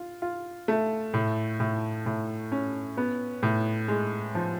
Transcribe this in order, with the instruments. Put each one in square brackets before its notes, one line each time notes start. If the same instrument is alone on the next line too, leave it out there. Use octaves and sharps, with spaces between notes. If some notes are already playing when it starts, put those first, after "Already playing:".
Already playing: [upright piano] F4
F4
A3
A2
A2
A2
C#4
B3
A2
G#3
F3